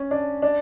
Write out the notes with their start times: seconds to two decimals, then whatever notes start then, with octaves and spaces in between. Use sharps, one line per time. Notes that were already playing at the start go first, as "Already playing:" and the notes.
Already playing: C#4
0.11 D4
0.42 D4